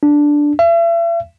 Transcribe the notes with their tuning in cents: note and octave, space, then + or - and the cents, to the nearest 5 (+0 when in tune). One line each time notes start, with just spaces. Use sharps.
D4 +0
E5 +40